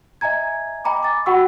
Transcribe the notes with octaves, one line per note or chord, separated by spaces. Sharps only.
D#5 E5 G#5 A#5 G#6
D#5 G5 G#5 A#5 B5 D6
D6 A6
F#4 F#5 G5 B5 C#6 E6